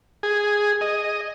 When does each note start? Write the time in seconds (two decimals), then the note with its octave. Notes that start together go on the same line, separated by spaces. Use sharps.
0.23 G#4
0.81 D#5